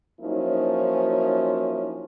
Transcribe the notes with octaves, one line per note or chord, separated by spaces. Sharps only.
F3 F#3 A#3 C#4 D#4 E4